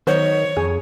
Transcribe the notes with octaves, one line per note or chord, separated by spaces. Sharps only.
D#3 F#3 B3 C5 C#5
F2 G#4